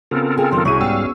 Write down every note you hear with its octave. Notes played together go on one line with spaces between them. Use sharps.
C#3 B3 C4 F4 A4 A#4
G#4 G5
F#2 D#3 C6
C2 C#4 E4 F#4 G#4 C#6 D#7
G#2 G3 B3 F5 G5 C#6 E6